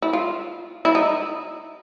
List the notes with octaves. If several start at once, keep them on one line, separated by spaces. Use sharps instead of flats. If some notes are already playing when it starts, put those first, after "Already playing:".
E4
F4
E4
D#4